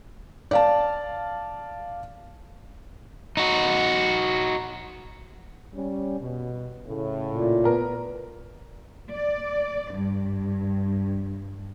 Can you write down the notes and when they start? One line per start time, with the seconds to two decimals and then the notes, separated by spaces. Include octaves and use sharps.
0.51 D5 F5 A5
3.37 D#4 F#4
5.74 G3 C#4
6.20 B2
6.87 A2 C#3
7.30 A#2
7.64 B3 A#4
9.12 D5
9.94 G2